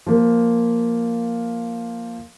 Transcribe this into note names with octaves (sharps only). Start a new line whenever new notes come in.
F3 A#3